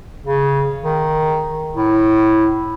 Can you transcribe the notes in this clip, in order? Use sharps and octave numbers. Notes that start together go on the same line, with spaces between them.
C#3
D#3
A2